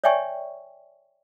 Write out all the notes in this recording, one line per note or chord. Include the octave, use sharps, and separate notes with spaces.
C#5 D5 E5 G5 G#5 C#6